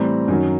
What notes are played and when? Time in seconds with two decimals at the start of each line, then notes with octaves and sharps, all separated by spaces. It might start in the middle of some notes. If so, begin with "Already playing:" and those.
Already playing: A2 E3 G3 C4 A#5
0.28 F#2 D#3 F#3